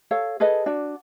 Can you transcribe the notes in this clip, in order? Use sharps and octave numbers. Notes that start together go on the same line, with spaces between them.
A4 C#5 F5
G#4 A4 B4 D#5
D4 F#4 D5